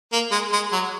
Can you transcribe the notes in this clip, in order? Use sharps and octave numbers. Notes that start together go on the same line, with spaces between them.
A#3
G#3
G#3
F#3